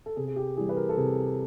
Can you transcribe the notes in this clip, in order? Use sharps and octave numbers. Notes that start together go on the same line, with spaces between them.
A4
C3 G#4
G#4
G4
E3 G3 G#4
B4
A#4
A4
C3 G#4